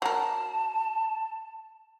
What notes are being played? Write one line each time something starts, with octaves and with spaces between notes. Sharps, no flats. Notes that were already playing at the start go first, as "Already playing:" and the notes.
F#3 A#4 A5